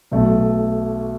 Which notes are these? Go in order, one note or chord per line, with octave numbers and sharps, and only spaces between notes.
B1 B2 A3